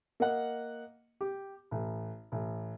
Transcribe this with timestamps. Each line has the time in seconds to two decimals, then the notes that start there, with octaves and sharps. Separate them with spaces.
0.20 A#3 D#5 F#5
1.21 G4
1.71 A1
2.32 A1